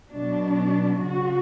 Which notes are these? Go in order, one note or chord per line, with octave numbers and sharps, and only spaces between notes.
B2 F#3 D4
C#3 F#3 F#4